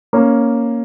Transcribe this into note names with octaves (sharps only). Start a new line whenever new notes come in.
A#3 C#4